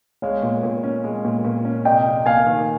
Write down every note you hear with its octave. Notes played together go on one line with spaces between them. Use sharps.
G#3 C#5 F5
A#2
A#2
C#4
G#3
A#2
A#2
C#4
C3 D#5 G5
F2
A#3 F5 G#5
D#3